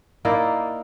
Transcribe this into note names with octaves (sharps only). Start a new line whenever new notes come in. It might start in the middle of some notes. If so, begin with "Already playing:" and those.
A#3 D#4 E4 D5